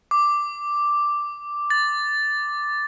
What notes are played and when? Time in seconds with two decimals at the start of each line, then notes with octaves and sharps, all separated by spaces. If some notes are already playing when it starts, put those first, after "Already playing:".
0.11 D6
1.70 A6